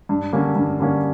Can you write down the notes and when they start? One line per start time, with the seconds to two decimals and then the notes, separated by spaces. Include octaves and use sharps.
0.09 G2
0.32 D3 G3 A#3 C#4
0.56 G2
0.79 D3 G3 A#3 C#4